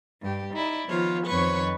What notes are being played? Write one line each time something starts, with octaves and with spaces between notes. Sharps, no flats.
G2 G4
D#4 E4 D5
D#3 F3 B3 F4 C5 C#5
F2 D#3 B4 C#5 C#6